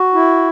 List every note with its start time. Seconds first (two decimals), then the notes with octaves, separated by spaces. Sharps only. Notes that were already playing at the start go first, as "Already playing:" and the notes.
Already playing: F#4
0.14 E4